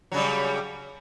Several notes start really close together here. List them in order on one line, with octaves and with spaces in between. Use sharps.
F#3 C#3 G3